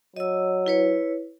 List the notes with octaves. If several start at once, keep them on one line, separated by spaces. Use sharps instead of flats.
F#3 D#5 E6
E4 B4 C#5